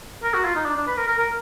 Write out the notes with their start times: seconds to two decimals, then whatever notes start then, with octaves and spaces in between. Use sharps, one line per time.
0.23 A#4
0.34 F#4
0.45 F4
0.56 D#4
0.66 D4
0.77 D4
0.87 B4
0.97 A#4
1.08 A#4
1.18 A#4